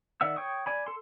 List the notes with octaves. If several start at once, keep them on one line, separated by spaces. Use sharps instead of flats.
D#3 D5 E5 F#5 E6
C#5 G5 C#6 D#6
D5 G#5 B5
A4 C6